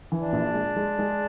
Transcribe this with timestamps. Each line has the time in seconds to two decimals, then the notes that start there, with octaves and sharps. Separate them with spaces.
0.12 E3
0.22 D4
0.33 A#1
0.54 G#3
0.76 G#3
0.99 G#3